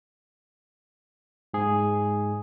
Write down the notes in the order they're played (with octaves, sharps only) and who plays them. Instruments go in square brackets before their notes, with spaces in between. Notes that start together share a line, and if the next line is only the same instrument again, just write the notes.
[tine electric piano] G#2 G#4